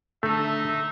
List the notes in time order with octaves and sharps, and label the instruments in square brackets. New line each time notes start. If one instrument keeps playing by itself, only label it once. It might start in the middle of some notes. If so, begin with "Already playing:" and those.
[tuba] D3 [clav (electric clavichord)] A3 [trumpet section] D#4 E5 [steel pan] A4